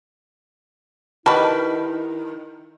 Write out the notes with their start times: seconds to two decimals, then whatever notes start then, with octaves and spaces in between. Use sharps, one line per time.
1.26 D#3 G3 E4 F#4 B4 A5